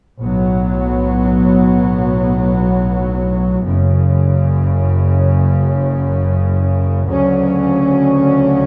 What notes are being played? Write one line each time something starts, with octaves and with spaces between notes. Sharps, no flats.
B1 A2 F#3 B3
F#1 F#2 C#3
D2 C#3 F#3 C#4